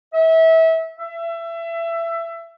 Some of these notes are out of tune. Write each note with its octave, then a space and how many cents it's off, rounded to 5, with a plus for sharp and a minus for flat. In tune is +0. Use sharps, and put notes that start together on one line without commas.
E5 -30
E5 +25